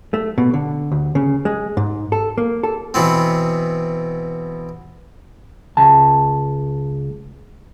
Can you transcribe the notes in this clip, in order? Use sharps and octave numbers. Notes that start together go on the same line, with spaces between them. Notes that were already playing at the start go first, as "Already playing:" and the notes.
A3
B2
D3
D2
C#3
G#3
G#2
A4
A#3
A4
B2 E3 B3 C4
C#2 A5